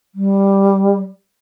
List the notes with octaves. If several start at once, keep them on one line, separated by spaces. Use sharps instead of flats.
G3